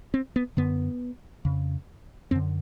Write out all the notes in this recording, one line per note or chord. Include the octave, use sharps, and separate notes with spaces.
C4
B3
F#2 D3 B3
F2 C#3
F#2 D3 C4